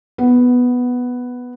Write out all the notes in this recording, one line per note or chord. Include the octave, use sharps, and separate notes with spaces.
B3